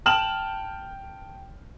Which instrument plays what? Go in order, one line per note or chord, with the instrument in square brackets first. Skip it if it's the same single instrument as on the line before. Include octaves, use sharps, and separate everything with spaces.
[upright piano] G5 A5 F6 E7 F#7